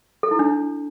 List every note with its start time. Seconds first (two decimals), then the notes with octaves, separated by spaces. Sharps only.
0.23 A4
0.31 E4
0.39 D4